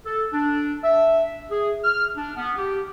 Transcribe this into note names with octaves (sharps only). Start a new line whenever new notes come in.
A4
D4
E5
G#4
F6
D4
B3
G4